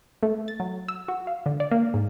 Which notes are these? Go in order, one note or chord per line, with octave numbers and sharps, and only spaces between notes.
A3
A6
F#3
E6
F#4
F5
D3
D5
A#3
G#2